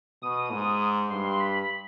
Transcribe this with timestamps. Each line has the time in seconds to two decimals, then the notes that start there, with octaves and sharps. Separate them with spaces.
0.22 B2 D#6
0.52 G#2
1.10 G2 C6
1.39 B5